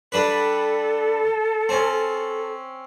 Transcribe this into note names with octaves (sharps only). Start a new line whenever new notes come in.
G3 D4 A4 B4
C4 C#4